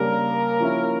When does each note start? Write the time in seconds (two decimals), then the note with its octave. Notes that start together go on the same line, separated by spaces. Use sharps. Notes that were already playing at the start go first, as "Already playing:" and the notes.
Already playing: C#3 G3 A#3 D4 A#4
0.60 F3 C#4 E4